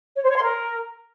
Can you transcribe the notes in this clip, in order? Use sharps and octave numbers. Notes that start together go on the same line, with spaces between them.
C#5
C5
C#5
C6
A#4